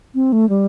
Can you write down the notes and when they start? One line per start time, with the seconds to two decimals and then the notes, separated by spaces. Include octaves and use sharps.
0.15 C4
0.32 A3
0.49 G3